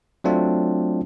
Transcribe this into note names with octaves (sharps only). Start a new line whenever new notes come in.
F#3 A3 C4 D4 F4